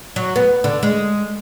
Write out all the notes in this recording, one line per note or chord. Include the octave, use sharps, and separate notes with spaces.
F#3
B3
D3
G#3